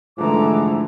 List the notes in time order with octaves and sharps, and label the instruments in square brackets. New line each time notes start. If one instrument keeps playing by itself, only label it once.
[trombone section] G#2 E3 [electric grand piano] D3 F3 [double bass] G#3 A3 [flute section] A#5 D6